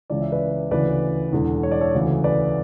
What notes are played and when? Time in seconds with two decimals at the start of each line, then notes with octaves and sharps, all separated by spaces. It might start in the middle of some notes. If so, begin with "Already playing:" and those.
0.10 C#2 C#3 E3 D5
0.22 E5
0.32 B4 D5
0.71 D2 C#3 E3 B4 D5
1.32 E1 E2 D3
1.63 C#5
1.71 D5
1.81 A4 C#5
1.95 D2 C#3 E3
2.24 B4 D5